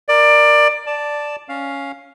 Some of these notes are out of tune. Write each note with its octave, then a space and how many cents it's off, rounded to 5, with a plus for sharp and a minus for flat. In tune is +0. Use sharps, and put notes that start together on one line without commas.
A#4 +0 D5 +20
D5 +0 A5 +0
C#4 +0 F5 +0